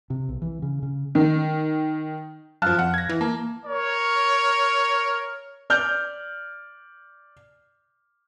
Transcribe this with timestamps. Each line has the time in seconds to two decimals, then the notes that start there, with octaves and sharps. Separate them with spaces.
0.10 C3
0.29 B1
0.42 E3
0.62 C#3
0.83 C#3
1.15 D#3
2.62 F#2 F3 F5 A5 F6 F#6
2.79 F2 F#5
2.94 G#6 A#6
3.09 E3
3.21 A#3 A5
3.66 A#4 C#5
5.70 D5 F6 G6